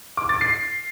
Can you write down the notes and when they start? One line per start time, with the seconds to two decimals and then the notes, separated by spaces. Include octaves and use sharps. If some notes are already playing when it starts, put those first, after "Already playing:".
0.17 D6
0.29 A6
0.41 C7